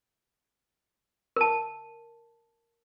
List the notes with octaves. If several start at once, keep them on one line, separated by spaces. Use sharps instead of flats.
A#4 A5